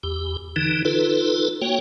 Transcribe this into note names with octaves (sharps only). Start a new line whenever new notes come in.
E2 G4
D3 E3 D#4
D#4 F4 A4 B4
A#3 F#4 C#5 G5